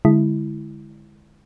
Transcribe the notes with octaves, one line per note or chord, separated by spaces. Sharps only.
D3 G#3 E4